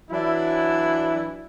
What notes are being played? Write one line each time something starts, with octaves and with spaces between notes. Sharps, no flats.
E3 F#3 D4 E4